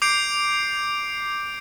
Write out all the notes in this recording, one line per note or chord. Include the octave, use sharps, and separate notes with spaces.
D6 G6 C7 D7